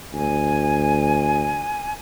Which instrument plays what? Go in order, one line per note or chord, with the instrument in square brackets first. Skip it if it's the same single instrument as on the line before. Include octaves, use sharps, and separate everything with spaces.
[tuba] D2 [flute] G#5